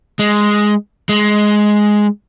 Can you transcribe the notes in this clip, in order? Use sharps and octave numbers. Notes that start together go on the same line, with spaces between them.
G#3
G#3